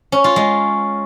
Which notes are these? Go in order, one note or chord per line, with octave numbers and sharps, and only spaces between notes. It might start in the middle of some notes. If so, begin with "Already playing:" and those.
C#4
F4
G#3